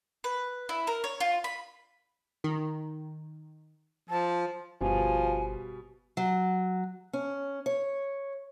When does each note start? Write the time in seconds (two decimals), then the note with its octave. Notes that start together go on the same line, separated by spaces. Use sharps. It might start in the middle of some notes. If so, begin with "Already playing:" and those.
0.24 B4
0.69 E4
0.87 A#4
1.04 C#5
1.20 F4
1.44 B5
2.44 D#3
4.10 F3 A5
4.81 G1 B2 F3 G3 G#5
6.17 F#3
7.13 C#4
7.66 C#5